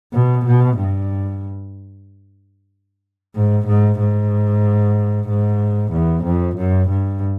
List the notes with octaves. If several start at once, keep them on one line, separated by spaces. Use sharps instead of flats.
B2
B2
G2
G#2
G#2
G#2
G#2
E2
F2
F#2
G2